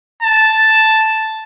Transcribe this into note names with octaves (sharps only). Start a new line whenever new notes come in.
A5